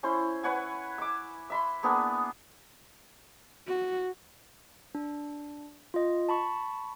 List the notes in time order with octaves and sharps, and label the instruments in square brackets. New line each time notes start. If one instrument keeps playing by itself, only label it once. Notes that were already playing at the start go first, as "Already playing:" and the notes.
[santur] C#4 E4 C5 C6
B4 C#5 F#5 G#5
D6 E6
E5 B5 C6
A#3 B3 D4 G#4
[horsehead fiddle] F#4
[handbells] D4
F4 D#5
A5 B5 C#6